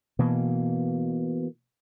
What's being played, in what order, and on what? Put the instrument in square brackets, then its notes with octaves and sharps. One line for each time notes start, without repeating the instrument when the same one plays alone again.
[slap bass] B2 E3 A#3